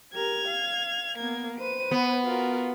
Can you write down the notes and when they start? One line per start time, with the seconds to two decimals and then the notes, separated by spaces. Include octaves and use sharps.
0.13 G4 A#4 G#6 F7
0.47 F5
1.17 A#3 B3 G#6
1.58 B4 C5 D#7
1.91 B3
2.26 F4 F#4 A#4